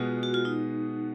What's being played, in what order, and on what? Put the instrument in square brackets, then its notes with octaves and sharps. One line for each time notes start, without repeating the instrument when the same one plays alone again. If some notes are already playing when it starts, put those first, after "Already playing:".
Already playing: [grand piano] B2 G#3 B3 [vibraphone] F4
[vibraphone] F#4
F4
D#4